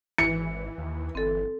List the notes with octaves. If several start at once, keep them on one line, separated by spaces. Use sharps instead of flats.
G#1 E3 C#7
D#2
G1 C4 A4